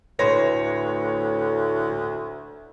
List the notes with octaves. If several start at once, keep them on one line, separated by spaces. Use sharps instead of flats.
D2 A2 E4 B4 C#5 C6 A#6